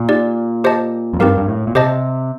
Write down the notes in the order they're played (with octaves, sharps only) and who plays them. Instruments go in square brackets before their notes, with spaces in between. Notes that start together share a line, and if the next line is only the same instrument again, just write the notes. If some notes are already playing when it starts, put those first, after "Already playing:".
Already playing: [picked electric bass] A#2
[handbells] D#4 G4 D5
G4 C5 D#5 A5
[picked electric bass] F2
[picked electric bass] G2 [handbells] C4 D#4 G4 A#4 F5
[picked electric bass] G2
A2
A#2
[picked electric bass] C3 [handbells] G4 C5 D#5 A5